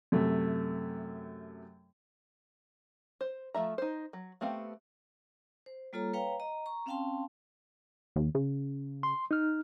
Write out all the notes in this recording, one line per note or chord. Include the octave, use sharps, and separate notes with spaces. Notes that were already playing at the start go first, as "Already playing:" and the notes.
F#2 C3 A3
C5
F3 A3 E5 A#5
D#4 C5
F#3
A3 B3 C4 G4 F5
C5
G3 A#3 F4 A4 C#5 A#5
B4 C#5 F5 G5 A#5
D#5 A#5
A#5 C#6
C4 C#4 F5 G5 A5 C6
D#2
C#3
C6
D#4 F6